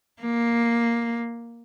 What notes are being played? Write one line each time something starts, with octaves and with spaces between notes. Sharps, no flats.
A#3